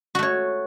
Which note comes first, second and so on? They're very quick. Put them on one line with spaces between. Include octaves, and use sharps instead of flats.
F#4 A3 C#5